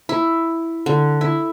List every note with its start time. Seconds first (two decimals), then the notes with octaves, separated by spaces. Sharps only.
0.09 E4
0.86 D3
1.21 E4